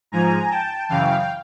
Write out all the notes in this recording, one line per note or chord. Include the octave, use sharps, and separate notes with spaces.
G#2 F3 G#5 A#5
G5 A5
F#2 C#3 E3 F5 G5